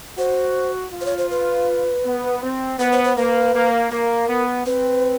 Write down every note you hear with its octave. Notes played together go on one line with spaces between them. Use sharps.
F#4 C5
F4
C5
C#5
C5
B4
B3
C4
B3 B4
C5
C5
A#3 B4
A#3
A#3 A#4
B3
C4 B4